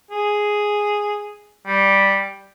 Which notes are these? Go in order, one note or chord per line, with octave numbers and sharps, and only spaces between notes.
G#4
G3